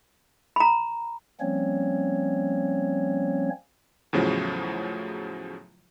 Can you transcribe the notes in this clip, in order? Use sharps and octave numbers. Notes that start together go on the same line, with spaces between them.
A#5 B5
F3 G3 A#3 C4 C#4 C#5
E2 A2 C#3 F3 F#3